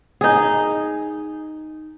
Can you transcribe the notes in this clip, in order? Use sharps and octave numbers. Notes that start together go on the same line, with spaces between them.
D#4 G#4